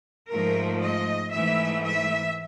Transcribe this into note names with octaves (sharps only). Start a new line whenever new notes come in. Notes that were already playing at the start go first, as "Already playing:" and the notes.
G#2 F3 A3 A#4
D#5
G#2 E3 A3 E5
E5